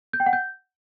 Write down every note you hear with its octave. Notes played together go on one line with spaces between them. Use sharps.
G6
G5
F#5
G6